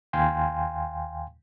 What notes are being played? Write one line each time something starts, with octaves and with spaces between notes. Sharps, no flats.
D#2 F5 G5 G#5 C6